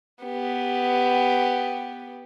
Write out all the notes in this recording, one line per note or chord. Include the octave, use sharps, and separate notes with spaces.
B3 G4